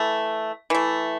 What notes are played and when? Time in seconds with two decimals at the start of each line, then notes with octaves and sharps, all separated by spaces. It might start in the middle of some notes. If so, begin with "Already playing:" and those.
Already playing: E3 A3
0.70 E3 A3